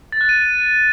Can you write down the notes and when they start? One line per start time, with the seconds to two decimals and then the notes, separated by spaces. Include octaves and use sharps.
0.12 A6
0.21 F#6
0.29 D#7